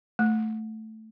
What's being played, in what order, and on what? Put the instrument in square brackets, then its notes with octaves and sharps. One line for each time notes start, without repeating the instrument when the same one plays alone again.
[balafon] A3